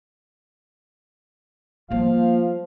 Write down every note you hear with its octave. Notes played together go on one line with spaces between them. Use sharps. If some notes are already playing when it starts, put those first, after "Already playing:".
F3 G3 A#3 F5